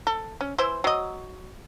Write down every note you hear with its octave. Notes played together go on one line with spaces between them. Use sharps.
A4
C#4
E3 E4 C5
F#3 D#5